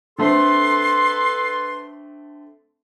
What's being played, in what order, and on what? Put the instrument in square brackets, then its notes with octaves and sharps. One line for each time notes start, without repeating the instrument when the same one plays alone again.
[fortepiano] D3 A3 C4 [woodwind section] A4 B4 C6